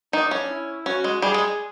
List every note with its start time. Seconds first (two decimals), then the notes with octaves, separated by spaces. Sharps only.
0.13 D#3 D4 D#4
0.31 C#4
0.49 E4
0.86 C#4 F#4
1.04 G#3
1.22 G3 G#4
1.34 G#3